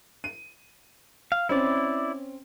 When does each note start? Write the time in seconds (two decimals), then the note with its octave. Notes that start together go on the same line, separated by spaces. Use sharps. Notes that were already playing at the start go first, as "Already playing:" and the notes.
0.24 D#7
1.32 F5
1.49 C4 C#4 E4 D5